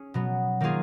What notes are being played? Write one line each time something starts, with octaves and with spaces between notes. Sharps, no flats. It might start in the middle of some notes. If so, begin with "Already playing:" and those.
Already playing: C#4 G#4
B2 F#3 B3
D#3 A#3 F4 G#4